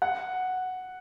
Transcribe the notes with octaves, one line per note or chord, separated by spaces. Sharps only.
F#5